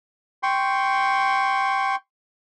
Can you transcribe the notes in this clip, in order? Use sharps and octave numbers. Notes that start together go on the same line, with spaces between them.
G5 C6 C#6